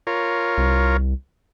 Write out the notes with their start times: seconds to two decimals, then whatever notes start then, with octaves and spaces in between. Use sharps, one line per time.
0.07 F4 A#4 C#5
0.58 C2